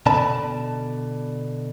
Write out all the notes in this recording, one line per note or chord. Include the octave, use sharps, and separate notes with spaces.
B2 D3 D5 A5 B5